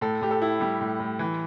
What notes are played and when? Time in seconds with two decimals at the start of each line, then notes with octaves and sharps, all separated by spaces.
0.01 A2 A4
0.21 A2 G4
0.31 A4
0.42 E4
0.60 G3 G4
0.81 A2
1.00 A2
1.19 E3